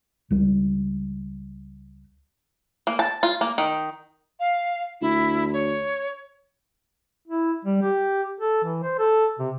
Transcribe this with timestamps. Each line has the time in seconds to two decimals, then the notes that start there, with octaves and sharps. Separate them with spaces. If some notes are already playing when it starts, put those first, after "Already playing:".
0.30 C#2 G3
2.87 A#3
2.99 A5
3.23 F4
3.41 A#3
3.58 D#3
4.40 F5
5.01 D2 E4
5.53 C#5
7.28 E4
7.65 G3
7.82 G4
8.40 A4
8.64 E3
8.83 C5
8.99 A4
9.39 C3